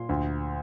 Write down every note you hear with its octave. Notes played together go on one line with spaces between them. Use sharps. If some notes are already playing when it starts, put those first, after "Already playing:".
Already playing: A#2 C6
D2